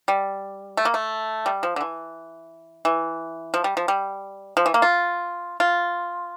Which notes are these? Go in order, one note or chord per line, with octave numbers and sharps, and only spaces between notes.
G3
A3
A#3
A3
G3
F3
D3
E3
E3
F3
G3
F3
G3
F3
E3
A#3
F4
F4